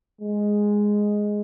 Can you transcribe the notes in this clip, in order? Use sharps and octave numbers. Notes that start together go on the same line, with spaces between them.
G#3